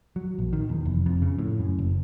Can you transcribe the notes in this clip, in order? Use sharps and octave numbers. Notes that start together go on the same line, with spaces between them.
F#3
A#1
D#3
E2
F1
F2
C#3
A2
F#2
F#1